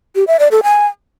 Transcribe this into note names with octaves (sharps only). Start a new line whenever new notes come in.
G4
E5
D5
A4
G#5